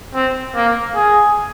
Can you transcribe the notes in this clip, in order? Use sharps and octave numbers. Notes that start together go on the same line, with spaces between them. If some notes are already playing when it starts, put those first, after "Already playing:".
C4
A#3
G#4